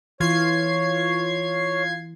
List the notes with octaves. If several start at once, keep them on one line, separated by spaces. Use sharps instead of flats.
E3 F4 C#5 G#6 C7